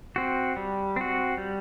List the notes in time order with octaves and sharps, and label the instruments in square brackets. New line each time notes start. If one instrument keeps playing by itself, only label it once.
[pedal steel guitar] C4 F#4
G3
C4 F#4
G3